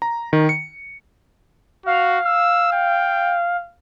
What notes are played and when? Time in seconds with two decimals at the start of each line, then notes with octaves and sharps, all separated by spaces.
0.02 A#5
0.33 D#3
0.49 C#7
1.86 F#4 F5
2.25 E6
2.73 G5